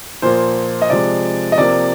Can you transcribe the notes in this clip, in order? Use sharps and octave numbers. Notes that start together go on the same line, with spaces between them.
A#2 F3 A#3 C5
D#5
C3 F3 G#3 D5
D#5
C3 F3 A#3 D5